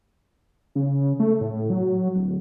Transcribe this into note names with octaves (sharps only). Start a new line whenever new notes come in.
C#3
A3
A2
F#3
D1